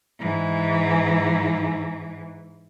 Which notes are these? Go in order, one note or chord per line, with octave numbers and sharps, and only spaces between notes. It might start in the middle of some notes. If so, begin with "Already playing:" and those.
G#2 E3